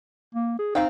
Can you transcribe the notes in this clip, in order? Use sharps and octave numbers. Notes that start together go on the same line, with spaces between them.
A#3
G#4
C4 D#4 F5 G5